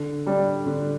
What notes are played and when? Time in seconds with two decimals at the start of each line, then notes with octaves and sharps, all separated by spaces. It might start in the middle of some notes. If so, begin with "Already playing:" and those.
Already playing: D3
0.26 G3 D4
0.66 D3